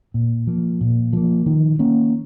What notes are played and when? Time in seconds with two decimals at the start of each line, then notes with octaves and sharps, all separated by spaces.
0.14 A#2
0.47 F3 A#3
0.81 A#2
1.13 F3 A#3
1.46 D#3
1.79 A#3 C#4